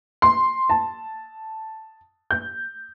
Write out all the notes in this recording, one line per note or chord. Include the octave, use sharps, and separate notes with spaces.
C6
A5
G6